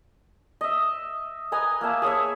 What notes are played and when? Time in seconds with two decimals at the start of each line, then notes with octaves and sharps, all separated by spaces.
0.61 D#5 E5
1.52 B4 D#5 G#5 A#5
1.81 A#3 B4 E5 A5
2.02 G#4 C#5 E5